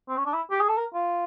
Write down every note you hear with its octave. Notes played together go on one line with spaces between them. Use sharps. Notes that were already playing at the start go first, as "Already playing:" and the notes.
C4
C#4
D4
E4
G4
G#4
A4
A#4
F4